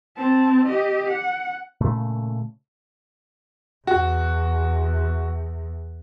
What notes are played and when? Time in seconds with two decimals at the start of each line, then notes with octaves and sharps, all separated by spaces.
0.17 C4 A5
0.65 G4 D#5
1.08 F#5
1.81 A#2 C#3 A3
3.87 E2 F#4